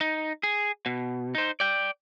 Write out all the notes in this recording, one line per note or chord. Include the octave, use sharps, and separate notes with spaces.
D#4
G#4
B2
D#4 C5
D5 G5